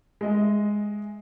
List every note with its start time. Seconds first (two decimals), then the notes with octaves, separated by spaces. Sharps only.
0.21 G#3 D#5 E5